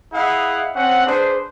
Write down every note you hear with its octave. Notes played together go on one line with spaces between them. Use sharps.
E4 G#4 D#5 F5 F#5
C4 C#4 F#5
D4 G#4 B4 C5